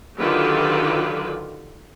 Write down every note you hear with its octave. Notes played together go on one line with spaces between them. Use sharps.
D3 D#3 F#3 F4 G4 B4